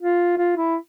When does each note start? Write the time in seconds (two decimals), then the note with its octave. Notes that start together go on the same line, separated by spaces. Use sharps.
0.02 F4
0.38 F4
0.57 E4